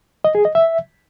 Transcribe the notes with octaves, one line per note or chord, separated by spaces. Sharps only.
D#5
G#4
D#5
E5